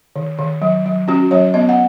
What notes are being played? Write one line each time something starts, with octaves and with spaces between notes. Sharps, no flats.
D#3
D#3
F#3
F#3
C#4 F#4
F#3 C#5
B3 D#5
F#5